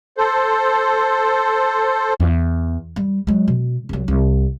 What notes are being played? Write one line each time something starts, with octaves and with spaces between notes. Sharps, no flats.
A4 C5
E2
G3
F#3 G#3
B2
C2 F#3
C2